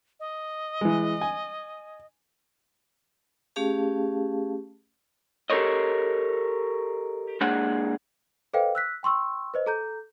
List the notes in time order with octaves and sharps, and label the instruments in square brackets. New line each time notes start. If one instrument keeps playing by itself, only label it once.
[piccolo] D#5
[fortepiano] E3 G#3
G#5
[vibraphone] A3 C#4 G4 G#4 F5 A5
[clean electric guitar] G4 A4 A#4 C5 C#5 D#5
G#3 A#3 D4 G#4 F#5
[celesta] A4 B4 C5 D#5 F5 G5
E6 F#6 B6
G5 C6 C#6 E6
B4 C5 D#5
A4 A#5 G6